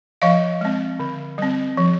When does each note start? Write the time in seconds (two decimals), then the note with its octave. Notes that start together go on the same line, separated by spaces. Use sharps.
0.22 F3 D#5 F5
0.61 G#3 C4
0.99 D3
1.38 G3 C4
1.77 F3